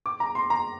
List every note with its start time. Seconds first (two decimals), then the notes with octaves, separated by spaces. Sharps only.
0.06 D6
0.20 A#5
0.35 C6
0.50 A#5